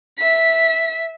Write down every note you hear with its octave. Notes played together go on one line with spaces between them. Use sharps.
E5 B6